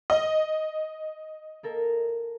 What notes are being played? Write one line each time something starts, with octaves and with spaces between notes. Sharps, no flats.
D#5
A#3 A4 A#4